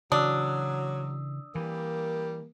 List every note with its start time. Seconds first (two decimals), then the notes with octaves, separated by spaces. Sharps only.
0.12 C#3 E3 F#3 D4 D#6 E6
1.55 E3 G3 A#3